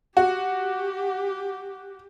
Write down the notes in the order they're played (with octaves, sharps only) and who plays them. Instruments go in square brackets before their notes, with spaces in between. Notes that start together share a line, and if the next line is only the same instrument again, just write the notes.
[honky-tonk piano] F#4 [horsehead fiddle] G4